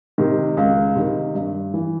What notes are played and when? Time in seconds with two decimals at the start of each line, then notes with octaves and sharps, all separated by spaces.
0.18 C3 D#3
0.57 C#2
0.95 C3 D#3
1.35 G2
1.74 E3